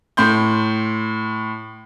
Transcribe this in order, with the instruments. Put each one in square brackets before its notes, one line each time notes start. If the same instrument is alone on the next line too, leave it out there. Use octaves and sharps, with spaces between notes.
[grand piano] A2 C6 G6